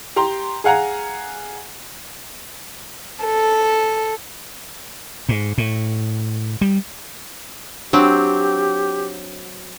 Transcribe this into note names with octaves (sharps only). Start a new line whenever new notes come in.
G4 A#5 C6
G#4 F5 F#5 G#5 A#5
A4
G#2
A2
G3
F#3 C4 D4 G4